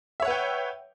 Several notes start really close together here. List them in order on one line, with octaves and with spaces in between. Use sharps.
E5 C#5 F#5 B4 G5